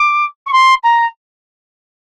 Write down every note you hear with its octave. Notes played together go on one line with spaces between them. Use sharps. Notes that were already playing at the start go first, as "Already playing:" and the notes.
Already playing: D6
C#6
C6
A#5